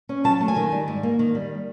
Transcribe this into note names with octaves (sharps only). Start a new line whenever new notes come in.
C#4
F#3 A5
A3
G#5
D#3
G3
G#2
A#3
D#3
G3